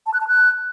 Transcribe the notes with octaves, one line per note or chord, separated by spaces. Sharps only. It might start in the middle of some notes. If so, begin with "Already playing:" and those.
A5
F#6
A5
F#6